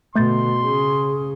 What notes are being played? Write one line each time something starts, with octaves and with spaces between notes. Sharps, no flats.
B2 D3 A3 C6 G6 A6
C#3 C#4 G#4